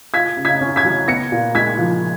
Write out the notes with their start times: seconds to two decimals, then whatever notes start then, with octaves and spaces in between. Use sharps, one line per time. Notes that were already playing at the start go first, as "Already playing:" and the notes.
0.14 F4 G#6 B6
0.37 C#3
0.45 G#6 B6
0.61 C#4
0.76 G#6 B6
0.84 F#3
1.08 B3 A#6 C#7
1.32 A#2
1.55 G#3 G#6 B6
1.78 F3